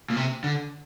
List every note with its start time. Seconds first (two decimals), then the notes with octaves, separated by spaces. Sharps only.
0.10 A#2
0.16 C3
0.44 D3